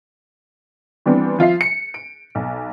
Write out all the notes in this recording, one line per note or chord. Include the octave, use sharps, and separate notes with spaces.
E3 G3 B3 C4 D4
F3 F4 E5 C7
C#7
D7
B1